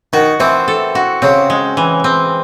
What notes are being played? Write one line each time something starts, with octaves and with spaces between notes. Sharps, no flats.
D#3 F#4
E3 C4
A4
F#4
C#3 C4
G#3
E3
C4